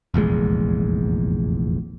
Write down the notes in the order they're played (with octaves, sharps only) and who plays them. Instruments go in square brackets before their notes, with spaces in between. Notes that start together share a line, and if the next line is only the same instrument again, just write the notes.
[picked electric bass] F1 A#1 E2 G#3